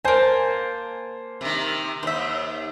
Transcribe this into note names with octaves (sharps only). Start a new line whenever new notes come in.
A#3 C5 G#5 A5
C3 D#3
D#2 C5 E5